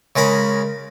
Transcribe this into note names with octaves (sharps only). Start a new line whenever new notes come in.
C#3 G#3 A#4 B5